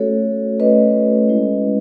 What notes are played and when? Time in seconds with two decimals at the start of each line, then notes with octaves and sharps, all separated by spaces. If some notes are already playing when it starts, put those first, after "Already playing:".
Already playing: A3 C#4 F#4 A4 C#5
0.60 A3 C#4 F#4 B4 D#5
1.29 G#3 C#4 E4